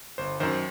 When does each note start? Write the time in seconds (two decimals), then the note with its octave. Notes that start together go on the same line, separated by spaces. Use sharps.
0.18 G1 C5
0.40 F#2 D#3 C5